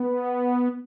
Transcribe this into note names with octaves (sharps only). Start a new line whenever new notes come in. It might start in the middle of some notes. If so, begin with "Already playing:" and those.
Already playing: B3